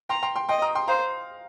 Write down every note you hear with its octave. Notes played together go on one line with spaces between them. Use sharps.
G5 A#5 C6
G5 C6
G5 C6
D#5 G5 C6
A#5 D#6
G5 C6
C5 F5 A#5